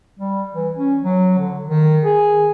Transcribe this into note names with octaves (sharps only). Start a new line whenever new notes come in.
G3
E3
C#4
F#3
D3
D#3
G#4